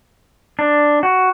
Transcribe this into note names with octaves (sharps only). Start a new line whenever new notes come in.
D4
F#4